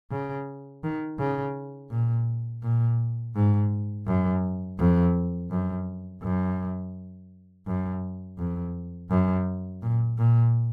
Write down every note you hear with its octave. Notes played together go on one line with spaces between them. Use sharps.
C#3
D#3
C#3
A#2
A#2
G#2
F#2
F2
F#2
F#2
F#2
F2
F#2
A#2
A#2